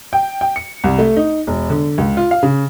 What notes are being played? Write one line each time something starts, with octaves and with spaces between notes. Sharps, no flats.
G5
G5
C#7
C2
A3
D#4
E1
D3
C#2
F4
F5
C#3